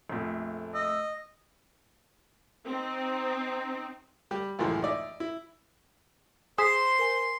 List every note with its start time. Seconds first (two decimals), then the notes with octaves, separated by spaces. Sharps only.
0.09 A#1 F2 A3
0.74 D#5 E6
2.65 C4 D#4
4.31 G3 G4
4.59 C#2 F#2 A2 E3 F3 G#3
4.82 D#4 D5 E5
5.20 E4
6.58 G#4 C5 C6 B6 C7 E7
6.99 A#4 G#5